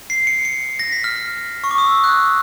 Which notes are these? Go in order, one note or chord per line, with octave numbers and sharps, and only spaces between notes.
C7
C#7
C#7
A#6
B6
F6
C#6
D6
D#6
E6
F#6